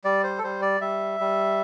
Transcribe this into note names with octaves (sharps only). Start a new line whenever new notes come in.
G3 D5
C5
A4
G3 C5
D5
G3 E5
G3